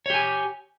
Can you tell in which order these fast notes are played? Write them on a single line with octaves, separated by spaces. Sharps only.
C#5 G4 G#5